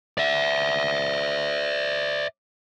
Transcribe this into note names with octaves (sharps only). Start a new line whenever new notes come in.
D5 E5